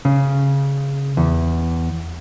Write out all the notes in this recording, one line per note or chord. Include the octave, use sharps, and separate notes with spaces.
C#3
E2